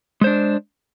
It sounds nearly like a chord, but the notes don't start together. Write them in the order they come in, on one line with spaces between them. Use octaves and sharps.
G#3 C5 D4